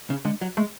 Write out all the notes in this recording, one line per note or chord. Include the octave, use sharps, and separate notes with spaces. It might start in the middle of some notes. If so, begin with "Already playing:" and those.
C#3
D3 G#3
F#3
G#3 A3